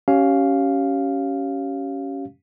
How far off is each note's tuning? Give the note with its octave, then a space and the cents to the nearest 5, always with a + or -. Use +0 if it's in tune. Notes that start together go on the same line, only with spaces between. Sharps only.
C#4 +0 G4 -30 F5 +0